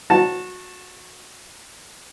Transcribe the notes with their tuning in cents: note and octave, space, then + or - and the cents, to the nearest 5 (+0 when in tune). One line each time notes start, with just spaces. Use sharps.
F#4 -20 A5 +0